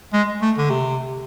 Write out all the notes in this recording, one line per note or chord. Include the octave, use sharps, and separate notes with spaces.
G#3
A3
D3
C3